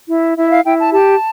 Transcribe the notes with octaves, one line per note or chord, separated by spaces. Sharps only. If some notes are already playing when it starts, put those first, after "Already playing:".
E4
E4 E5
F5
E4 G5
A5
G4 A5